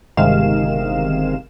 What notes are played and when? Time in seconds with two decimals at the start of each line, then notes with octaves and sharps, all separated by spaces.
0.17 G1 C3 D#3 G#3 F5 E7